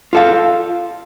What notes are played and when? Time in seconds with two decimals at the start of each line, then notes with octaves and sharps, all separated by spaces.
0.13 F4 A4 F5